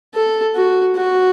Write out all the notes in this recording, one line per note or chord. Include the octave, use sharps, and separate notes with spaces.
A4
F#4
F#4